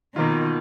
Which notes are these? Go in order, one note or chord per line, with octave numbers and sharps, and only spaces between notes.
B2 D#3 A#3 F4